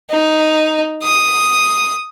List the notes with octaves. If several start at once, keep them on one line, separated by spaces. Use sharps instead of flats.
D#4
D#6